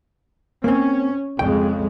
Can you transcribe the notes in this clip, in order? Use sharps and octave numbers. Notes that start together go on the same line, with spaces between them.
A#3 C4 C#4
F2 C#3 G#3 G5